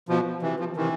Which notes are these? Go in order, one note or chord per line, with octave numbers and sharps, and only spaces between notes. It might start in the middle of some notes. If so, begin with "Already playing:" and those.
B2 F3
C3 E3
F3
C3 D#3 E3